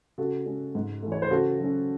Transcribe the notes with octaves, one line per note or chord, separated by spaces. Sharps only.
C#3 F#4 A4
G#3 C#4
G#2
E3 A3
C#5
C5
C#3 F#4 A4
F#3
C#4